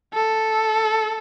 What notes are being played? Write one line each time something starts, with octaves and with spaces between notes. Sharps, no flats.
A4